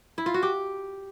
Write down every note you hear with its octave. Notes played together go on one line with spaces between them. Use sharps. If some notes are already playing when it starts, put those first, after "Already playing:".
E4
F4
F#4
G4